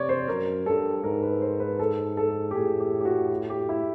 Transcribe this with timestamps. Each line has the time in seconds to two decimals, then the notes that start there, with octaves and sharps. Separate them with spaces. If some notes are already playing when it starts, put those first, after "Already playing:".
Already playing: C3 C#5 D5
0.09 C5
0.28 F#2 A#4
0.66 G2 A4
1.03 G#2 A#4
1.23 B4
1.42 C5
1.60 B4
1.79 A4
2.17 A4
2.51 G4
2.54 A2 G#4
2.80 G4
3.00 G4
3.05 F#4
3.31 F#4
3.50 G4
3.69 E4